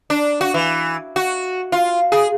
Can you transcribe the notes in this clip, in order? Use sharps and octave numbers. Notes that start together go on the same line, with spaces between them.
D4
F#4
E3
F#4
F4
G#4